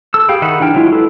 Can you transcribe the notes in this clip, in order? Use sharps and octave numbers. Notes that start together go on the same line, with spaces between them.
A4 E6
G4 G#4 F5 G5 B5
D#3 D#4 E5 F#5 B5
E3 D4 G5 F6
F#3 G#3 E4 F4
A4 B4